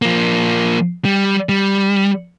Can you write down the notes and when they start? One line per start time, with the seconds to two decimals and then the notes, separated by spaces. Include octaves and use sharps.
0.02 F3 A#3
1.05 G3
1.49 G3